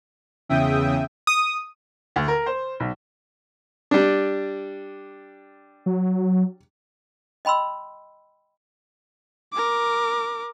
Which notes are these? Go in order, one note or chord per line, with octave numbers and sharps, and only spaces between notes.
E2 C#3 E5 G5 D#6
D#6
D2
A#4
C5
B1
G3 D4
F#3
D#5 G5 B5 C6 E6
A#4 D6